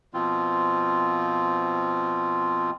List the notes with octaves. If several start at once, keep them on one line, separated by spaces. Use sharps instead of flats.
B2 F3 C4 F4